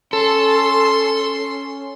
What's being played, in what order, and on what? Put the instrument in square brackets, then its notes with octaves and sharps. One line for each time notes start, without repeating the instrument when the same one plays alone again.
[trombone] C#4 [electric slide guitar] A4 [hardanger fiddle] C6